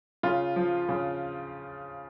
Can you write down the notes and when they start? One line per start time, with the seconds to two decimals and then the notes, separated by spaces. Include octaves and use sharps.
0.23 C#3 F4
0.56 F3
0.89 C#3